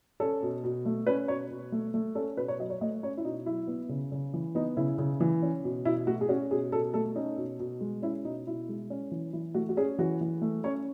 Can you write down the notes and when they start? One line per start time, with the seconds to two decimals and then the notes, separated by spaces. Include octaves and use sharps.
0.20 C#4 A4
0.42 B2
0.64 B2
0.86 A3
1.07 C#4 B4
1.28 B2 C#5
1.51 B2
1.72 A3
1.94 A3
2.15 C#4 A4
2.37 B2 B4
2.48 C#5
2.59 F#3 D#5
2.70 C#5
2.81 A3 D#5
3.03 C#4 C#5
3.17 E4
3.25 B2 D#4
3.46 F#3 E4
3.67 B3
3.89 C#3
4.12 C#3
4.34 E3
4.55 B3 D#4
4.77 C#3 E4
4.98 C#3
5.20 E3
5.42 C#4
5.64 B2
5.85 B2 E4
6.07 A3 F#4
6.21 G#4
6.29 C#4 F#4
6.51 B2 G#4
6.72 B2 A4
6.94 A3 A4
7.15 C#4 D#4
7.37 B2
7.60 B2
7.81 G#3
8.02 C#4 E4
8.25 B2 D#4
8.46 B2 E4
8.69 G#3
8.90 C#4
9.11 E3
9.33 E3 E4
9.54 A3 F#4
9.69 F#4
9.77 C#4 G#4
9.98 E3 F#4
10.21 E3
10.41 A3
10.64 C#4 C#5